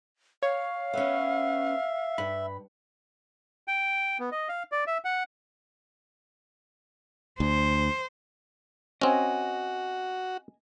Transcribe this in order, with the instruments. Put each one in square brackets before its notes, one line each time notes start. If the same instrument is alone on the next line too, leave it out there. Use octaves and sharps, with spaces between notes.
[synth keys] C#5 [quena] F5
[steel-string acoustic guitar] B3 C#4 [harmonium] E5
[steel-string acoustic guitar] G2 [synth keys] B5
[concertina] G5
B3
D#5
F5
D5
E5
F#5
[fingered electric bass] D2 [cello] C5
[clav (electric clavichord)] C4 C#4 [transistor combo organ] F#4 [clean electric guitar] D#5 G#5